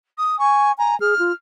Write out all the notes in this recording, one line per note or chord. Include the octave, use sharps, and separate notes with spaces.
D#6
G#5 C#6
G#5 A#5
G#4 F6
F4